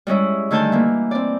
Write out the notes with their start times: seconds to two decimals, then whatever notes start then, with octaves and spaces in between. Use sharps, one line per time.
0.07 G3 G#3 C#4 E4
0.51 D3 D#3 A3 G#5 A5 G6
0.72 E3 A#3
1.11 C4 D5